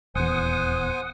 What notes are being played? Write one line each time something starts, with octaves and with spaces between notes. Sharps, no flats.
D#1 E2 C5 F#5 G#5 D#6